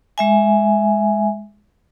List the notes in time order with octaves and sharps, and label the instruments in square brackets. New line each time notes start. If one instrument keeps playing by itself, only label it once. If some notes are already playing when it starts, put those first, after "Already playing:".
[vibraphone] G#3 E5 G#5